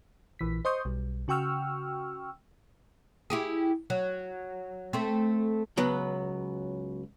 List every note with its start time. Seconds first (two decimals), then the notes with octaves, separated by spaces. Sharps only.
0.39 A#1 E3 B6
0.65 C5 D#5 C6 C#6 D#6 G6
0.85 B1 G3
1.28 C#3 F#4 G5 C#6 E6 F6
3.30 E4 G4 G#4
3.90 F#3
4.93 A3 C4
5.77 C#2 F#3 B3